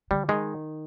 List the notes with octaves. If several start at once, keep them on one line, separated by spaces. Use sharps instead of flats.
D3 G3
D#3 G#3